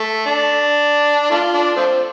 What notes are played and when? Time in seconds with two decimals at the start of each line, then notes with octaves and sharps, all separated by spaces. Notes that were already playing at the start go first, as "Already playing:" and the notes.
Already playing: A3
0.26 D4
1.31 A3 D4 F4
1.54 D4
1.77 F3 A3 C4